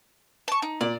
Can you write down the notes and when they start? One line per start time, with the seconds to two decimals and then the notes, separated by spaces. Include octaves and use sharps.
0.48 A5 C#6
0.62 D#4
0.81 A#2 D5